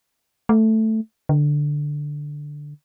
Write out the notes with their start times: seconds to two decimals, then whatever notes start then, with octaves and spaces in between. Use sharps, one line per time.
0.49 A3
1.29 D3